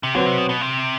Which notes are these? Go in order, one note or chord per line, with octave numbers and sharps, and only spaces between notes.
C3
D3 F#3 C4 F#4 B4
C3
B2
B2
C3